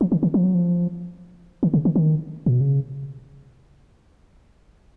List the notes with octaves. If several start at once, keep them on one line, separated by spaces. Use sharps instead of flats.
F3
D#3
D#3
F3
F#3
F3
D#3
C#3
D#3
D#3
A#2
B2
C#3